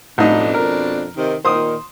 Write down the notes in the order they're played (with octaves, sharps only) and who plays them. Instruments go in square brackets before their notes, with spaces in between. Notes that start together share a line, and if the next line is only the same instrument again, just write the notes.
[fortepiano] A1 D#4 [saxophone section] F2 B2 D4
[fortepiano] A#4
[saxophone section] C3 D#3
[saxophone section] A#2 D#3 [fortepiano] C5 D#6